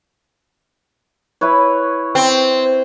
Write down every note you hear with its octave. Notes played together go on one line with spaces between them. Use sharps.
E4 B4 C#5
C4